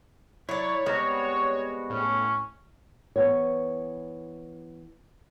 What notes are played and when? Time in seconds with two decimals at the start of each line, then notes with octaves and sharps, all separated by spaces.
0.49 F#3 E4 C#5 D5
0.86 G3 G#3 B3 C4 F#4 A#5
1.90 A2 C#4
3.16 E3 B3 C#5